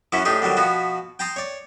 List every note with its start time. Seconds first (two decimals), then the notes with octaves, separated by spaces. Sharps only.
0.12 F#2 E3 F#3 C#4 E4
0.25 A2 D4 D#4 G4 G#4
0.42 D3 D#3 F#3 G3
0.57 B2 F3 B3 F#4
1.19 G5 A5 A#5 C6 D#6
1.36 C#5 D5